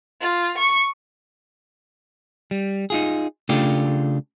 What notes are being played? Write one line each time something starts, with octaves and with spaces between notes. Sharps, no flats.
F4
C#6
G3
D#4 F4 G#4
C#3 A3 D4 F4 G4